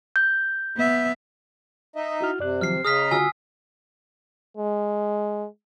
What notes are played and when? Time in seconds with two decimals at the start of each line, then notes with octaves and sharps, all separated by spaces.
0.16 G6
0.76 B3 E5
1.96 D#4 D#5 E5
2.21 E4 F#4 F6
2.39 F#2 C3 D5 F#6
2.61 D#3 F3 F#3 F6 C7
2.85 C#3 G#4 D#5 A#5 D#6 F6 B6
3.11 D3 F4 F#4 G#5 E6 F6
4.57 G#3